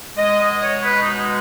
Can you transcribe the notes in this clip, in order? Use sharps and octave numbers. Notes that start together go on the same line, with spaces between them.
B2 G#3 D#5
D#5
C#5
B4
D#4
D#4